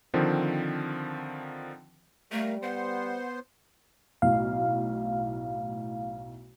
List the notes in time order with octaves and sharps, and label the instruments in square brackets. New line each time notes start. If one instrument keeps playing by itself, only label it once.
[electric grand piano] D3 D#3 F3 C4
[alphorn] G3 [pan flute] A3 [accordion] A#4 F5
[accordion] B3 C5 C6 [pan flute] F#5
[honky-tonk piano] B1 A2 [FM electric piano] F5